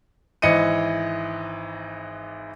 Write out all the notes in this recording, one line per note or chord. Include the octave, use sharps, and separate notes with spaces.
G#1 E3 D#5 C#7 D#7